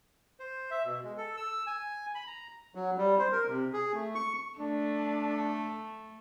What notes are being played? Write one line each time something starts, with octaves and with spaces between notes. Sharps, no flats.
C5
E5
B2
G#3
A4
E6
G#5
B5
A#5
F#3
G3
C5
A#4
C3
G#4
A3
C#6
A3 D4